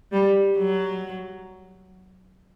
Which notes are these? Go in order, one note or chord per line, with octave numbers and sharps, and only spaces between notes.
G3
F#3